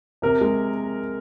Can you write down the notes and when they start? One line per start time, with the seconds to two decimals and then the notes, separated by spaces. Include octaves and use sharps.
0.22 C3 A#4
0.41 G#3